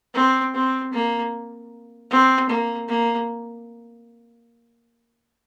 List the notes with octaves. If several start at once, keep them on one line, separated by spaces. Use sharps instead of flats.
C4
C4
A#3
C4
A#3
A#3